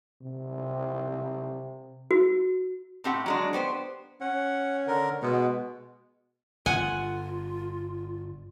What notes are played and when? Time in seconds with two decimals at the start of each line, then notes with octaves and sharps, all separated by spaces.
0.22 C3
2.11 F#4
3.04 A2 C4 G4 F#5
3.26 F#3 G#3 D4
3.53 B3 G4 C5
4.21 C#4 F#5
4.87 D3 A#4
5.22 B2 G#3 B3
6.66 G1 F4 F#5 G#5